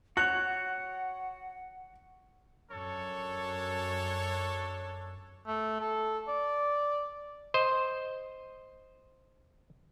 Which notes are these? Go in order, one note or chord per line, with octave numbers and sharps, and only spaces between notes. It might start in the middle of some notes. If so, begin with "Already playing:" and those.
F#4 C#5 F#5 F#6
F#2 D4 A4 C#5
A3
A4
D5
C5 D#5